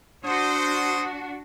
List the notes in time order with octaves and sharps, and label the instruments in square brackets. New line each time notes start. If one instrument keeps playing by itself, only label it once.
[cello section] D4 F#4 [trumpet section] C5 D#6